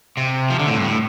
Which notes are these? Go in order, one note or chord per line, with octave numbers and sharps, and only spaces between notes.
C3
F3
D3
A2
G2
A2